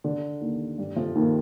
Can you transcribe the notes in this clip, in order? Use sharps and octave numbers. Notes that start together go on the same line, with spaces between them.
D3
D#2 D#3
G2 G3
F2 F3
D#2 D#3